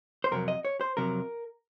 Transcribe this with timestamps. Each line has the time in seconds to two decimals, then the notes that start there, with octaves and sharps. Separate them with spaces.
0.24 C5
0.31 F2 C3 F#3 A#4
0.48 D#5
0.65 C#5
0.81 C5
0.97 F2 C3 F#3 A#4